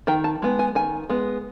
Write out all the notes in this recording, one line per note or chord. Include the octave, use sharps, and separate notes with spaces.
D#3 G5
A5
G#3 B3
G#5
D#3 G#5
G#3 B3